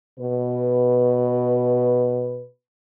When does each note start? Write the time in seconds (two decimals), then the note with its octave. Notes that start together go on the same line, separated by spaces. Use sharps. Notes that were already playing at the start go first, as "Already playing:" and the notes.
0.20 B2 B4